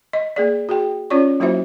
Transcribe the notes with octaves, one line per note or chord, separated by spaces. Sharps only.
D#5
A#3 G#4 D5
F#4 G#4 G5
C#4 F4 C#5 D5 C#6
F#3 A#3 E4 F#4 C5 E5